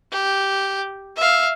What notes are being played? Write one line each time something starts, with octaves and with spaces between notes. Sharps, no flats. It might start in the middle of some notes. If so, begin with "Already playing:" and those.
G4
E5 F5